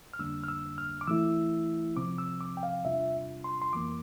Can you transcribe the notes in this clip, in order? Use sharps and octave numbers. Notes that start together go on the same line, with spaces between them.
F6
F2 D3 G3 A#3 D4 E6
F6
E6
F6
D6
E3 A3 E4 E6
C3 F3 C4 D6
E6
D6
G5
F5
E2 C3 G3 D4 F4 E5
C6
C6
F2 E3 A#3 D6